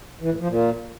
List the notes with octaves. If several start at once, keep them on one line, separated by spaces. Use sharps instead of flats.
E3
A2
F3
A#2